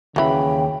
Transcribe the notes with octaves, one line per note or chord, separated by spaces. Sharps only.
D#2 C#3 E3 F#3 G5 B5